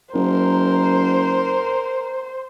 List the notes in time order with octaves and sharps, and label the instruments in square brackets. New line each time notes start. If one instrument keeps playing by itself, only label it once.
[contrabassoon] F#1 [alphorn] A#4 [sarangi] C5